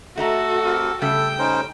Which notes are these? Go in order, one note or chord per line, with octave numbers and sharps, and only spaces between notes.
A3 F#4 A4 D#5 A#5
C4 G4 A#4
C#3 G3 A3 A4 G5
C#4 D#4 C5